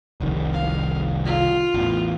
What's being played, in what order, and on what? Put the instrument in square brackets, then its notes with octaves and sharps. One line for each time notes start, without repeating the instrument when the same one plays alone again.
[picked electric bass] F1 C2 D#3
[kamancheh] F5
F4
[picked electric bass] A1 E2